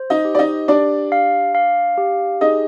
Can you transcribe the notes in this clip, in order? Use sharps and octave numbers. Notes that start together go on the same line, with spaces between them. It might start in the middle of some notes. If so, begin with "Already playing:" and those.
Already playing: C5
D#4 D#5
G4
D5
D#4 D#5
D4 G4 D5
F5
F5
G4
D#4 G#4 D#5